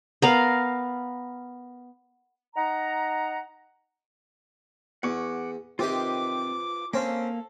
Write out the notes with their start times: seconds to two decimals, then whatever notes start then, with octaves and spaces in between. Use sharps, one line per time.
0.22 B3 A#4 F5
2.55 D#4 F#5 A#5
5.03 E2 F#5 C#6 D6
5.79 C3 D#3 F4 G4 B4 C5 D6
6.93 A#3 C4 C#4 A4 F5